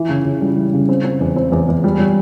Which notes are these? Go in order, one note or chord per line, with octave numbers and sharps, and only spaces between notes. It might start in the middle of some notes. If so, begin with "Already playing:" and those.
Already playing: E3
C#3
C#3
G3
E3
C#3
C4
C4
E2
C4
E2
E2
G3
G3